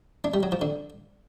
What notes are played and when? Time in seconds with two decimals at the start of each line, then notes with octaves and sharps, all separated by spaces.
0.24 D4
0.34 G3
0.43 F#3
0.52 F3
0.61 D3